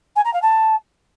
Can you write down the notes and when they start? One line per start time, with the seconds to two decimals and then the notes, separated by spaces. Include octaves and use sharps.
0.16 G#5
0.25 A#5
0.34 F5
0.42 A5